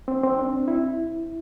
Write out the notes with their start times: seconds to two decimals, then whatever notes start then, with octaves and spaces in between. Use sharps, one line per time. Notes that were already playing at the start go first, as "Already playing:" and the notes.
0.08 C4
0.23 C4
0.38 D4
0.68 E4